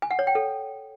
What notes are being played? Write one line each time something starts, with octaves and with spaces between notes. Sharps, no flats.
G#5
F#5
C#5
G5
A4